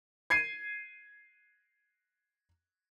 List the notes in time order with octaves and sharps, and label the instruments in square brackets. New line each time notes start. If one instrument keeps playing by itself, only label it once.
[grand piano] G#6 C7 D#7